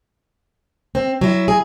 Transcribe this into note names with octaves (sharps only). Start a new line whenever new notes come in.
C4
F#3 E4
G#4